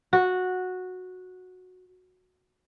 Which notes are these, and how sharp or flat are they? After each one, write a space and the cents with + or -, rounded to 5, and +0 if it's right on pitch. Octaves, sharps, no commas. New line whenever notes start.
F#4 -10